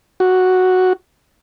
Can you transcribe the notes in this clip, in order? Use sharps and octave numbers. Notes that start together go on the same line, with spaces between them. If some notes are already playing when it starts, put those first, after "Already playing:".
F#4